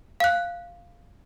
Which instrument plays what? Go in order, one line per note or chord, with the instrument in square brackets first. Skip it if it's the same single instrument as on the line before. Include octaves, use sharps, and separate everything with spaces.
[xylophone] F5 F#6